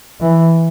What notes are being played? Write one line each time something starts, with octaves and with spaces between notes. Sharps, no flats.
E3